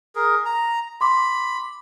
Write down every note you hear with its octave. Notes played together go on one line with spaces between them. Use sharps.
G#4 A#4
A#5
B5 C6 D6